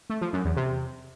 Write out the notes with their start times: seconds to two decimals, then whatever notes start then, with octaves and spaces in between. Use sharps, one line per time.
0.10 A3
0.21 F3
0.33 F#2
0.45 E2
0.56 C3